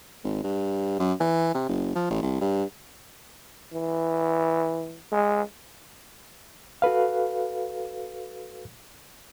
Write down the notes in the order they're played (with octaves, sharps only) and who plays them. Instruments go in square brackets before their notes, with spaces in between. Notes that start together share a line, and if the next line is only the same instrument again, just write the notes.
[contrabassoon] G#1
G2
F#2
E3
C3
F#1
F3
A1
C2
G2
[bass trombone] E3
G#3
[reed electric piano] F#4 A4 B4 F5